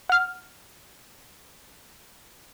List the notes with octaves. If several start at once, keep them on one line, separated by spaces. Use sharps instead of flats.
F#5 F6